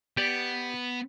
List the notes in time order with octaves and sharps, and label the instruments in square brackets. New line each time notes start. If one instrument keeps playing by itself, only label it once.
[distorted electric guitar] B3 [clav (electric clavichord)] G4 D5